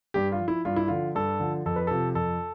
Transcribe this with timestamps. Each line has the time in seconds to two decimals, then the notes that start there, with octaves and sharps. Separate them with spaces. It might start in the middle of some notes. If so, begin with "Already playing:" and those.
0.14 G2 G4
0.32 F4
0.39 F3
0.48 E4
0.65 G2 F4
0.76 E4
0.88 D3 F3 F4
1.15 G2 A4
1.40 D3 F3
1.66 F2 A4
1.76 B4
1.87 C3 F3 A4
2.15 F2 A4